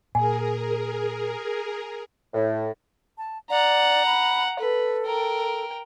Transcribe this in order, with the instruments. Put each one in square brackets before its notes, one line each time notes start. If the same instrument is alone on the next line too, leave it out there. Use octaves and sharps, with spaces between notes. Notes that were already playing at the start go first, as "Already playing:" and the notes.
[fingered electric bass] A#2 [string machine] G#4 A#4 [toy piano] G#5
[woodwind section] A2
[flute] A5
[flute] D5 [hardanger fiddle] F#5 A#5
[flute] B5
[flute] A4 [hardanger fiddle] B4
[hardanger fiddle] A#4 G5